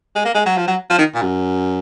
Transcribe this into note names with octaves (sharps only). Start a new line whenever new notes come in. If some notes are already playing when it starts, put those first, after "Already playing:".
G#3
A#3
G#3
F#3
F3
F#3
F3
D#3
A#2
F#2